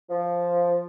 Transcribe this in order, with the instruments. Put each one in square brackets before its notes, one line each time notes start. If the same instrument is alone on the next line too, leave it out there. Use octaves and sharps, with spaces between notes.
[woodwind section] F3